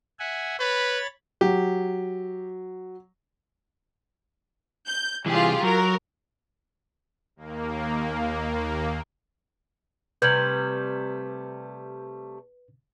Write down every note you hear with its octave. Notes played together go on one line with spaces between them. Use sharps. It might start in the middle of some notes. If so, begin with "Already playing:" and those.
E5 F#5 G#5
B4 C#5 B5 A6
F#3 G4
G6
C2 E3 F4 G4 G#4
F#3 A#4
D#2 A#3
C3 G3 A3 B4 G6 G#6 F#7